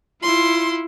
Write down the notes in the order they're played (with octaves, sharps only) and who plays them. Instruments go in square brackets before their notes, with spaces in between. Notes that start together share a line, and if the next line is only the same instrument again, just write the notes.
[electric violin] E4 F4 [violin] C6